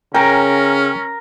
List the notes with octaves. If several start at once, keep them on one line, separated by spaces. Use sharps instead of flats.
C#3 C#4 A#4 G5 G#5 A#5